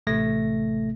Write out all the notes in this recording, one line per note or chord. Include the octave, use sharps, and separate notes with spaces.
A1 C3 A3 A#6